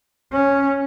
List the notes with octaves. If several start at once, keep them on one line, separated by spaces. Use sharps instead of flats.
C#4